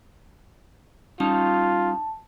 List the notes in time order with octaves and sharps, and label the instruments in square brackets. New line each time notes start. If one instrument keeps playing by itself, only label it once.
[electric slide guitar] G3 C#4 D#4 [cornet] F4 [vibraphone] A5